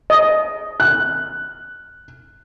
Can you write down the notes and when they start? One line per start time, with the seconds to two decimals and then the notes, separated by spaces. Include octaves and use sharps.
0.10 D#5
0.80 F#6